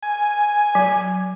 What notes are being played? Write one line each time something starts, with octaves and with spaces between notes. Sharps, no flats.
G#5
F#3